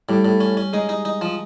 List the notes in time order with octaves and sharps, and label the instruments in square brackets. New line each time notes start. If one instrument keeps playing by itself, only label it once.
[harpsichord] A2 [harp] G3 G4
[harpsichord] A2
C#4
C#4
[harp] G#3 G#4 [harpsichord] D#4
[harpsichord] D#4
D#4
F3